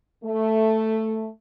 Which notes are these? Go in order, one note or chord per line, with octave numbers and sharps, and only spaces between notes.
A3